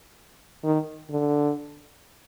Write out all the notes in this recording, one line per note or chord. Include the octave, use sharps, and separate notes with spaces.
D#3
D3